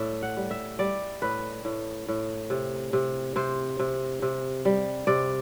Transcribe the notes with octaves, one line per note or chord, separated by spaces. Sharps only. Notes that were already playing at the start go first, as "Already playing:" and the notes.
Already playing: A2 D5 E5
F#5
G3
E5
G3 D5
A2 B4
A2
A2
C3
C3
C3 C5
C3
C3
G3
C3 D5